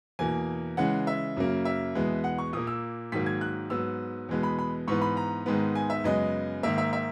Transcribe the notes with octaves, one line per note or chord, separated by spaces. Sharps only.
E2 B2 A#3 G#5
C#3 E3 G#3 F#5
E5
F#2 C#3 F#3 A#3
E5
E2 B2 G#3 B3
F#5
C#6
A#2 A#3 D#6
E6
G#2 D#3 F#3 A#3 B6
G#6
F#6
G#2 F#3 B3 E6
E2 B2 G#3 B3
B5
B5
G#2 E3 B3 C#6
B5
A#5
G#2 D#3 G#3 B3
G#5
E5
F#2 C#3 G#3 B3 D#5
G#2 D#3 A#3 E5
E5
E5